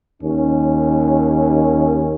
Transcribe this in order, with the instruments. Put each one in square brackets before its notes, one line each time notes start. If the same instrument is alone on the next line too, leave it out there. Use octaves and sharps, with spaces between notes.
[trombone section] D#2 C#4